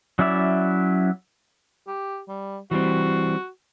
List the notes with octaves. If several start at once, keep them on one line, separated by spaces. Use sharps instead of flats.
F#3 C#4 E4 D5 E5
G4
G3
E3 G3 C4 F#4